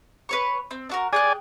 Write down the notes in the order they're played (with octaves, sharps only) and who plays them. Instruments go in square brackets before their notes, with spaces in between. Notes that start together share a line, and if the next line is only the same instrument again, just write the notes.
[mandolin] B4 C#5 C#6
C4
D4 F#4 A#4
[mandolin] G#4 G5 F#6 [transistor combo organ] D5 G#5